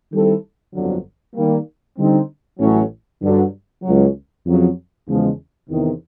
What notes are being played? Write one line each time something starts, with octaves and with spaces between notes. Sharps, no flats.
D#3 G3 C4 E4 A4
G1 F2 D3 F#3
D#3 G3 A#3
D3 G3 C4 D#4
A1 A2 F#3 A3 C#4
G2 D3 F#3
C#2 C#3 F#3
F2 C#3 F#3
E2 C#3 F3 G#3
E2 C3 D#3